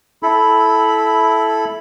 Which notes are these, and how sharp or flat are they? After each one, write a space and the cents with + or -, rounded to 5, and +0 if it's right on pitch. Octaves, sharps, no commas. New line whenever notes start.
E4 +0 A4 -15 B5 +0